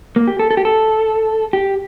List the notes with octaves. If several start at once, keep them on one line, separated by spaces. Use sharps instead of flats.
A#3
G4
A4
A4
G4
A4
G4